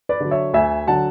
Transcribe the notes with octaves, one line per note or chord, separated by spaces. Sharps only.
B4 D5
D3 F#3
C#5 E5
D2 E5 G#5
D3 F#3 F#5 A5